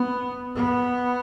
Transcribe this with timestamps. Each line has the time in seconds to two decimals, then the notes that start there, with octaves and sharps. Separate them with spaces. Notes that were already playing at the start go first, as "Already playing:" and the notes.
Already playing: B3
0.55 B3